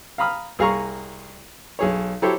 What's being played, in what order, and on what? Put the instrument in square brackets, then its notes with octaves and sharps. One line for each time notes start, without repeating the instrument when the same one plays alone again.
[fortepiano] F5 A#5 B5 D#6 F6
C2 G#4 F5 A#5 C#6 F6
B1 G#4 C#5
F#3 E4 G4 A4 C5 C#5